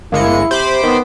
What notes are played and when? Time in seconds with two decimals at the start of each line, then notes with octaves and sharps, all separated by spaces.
0.12 G1 G#3 A#3 E4 C#7
0.51 C3 C5 B5 D6
0.83 D#3 B3